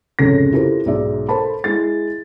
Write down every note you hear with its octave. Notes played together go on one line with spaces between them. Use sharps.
F1 C#2 G#2 C#3 A4 A#6
E4 F4 G4 A4 A#4 C5
B1 G#2 D#4 D5 E5
A4 A#4 C5 A5 B5
G#3 E4 A6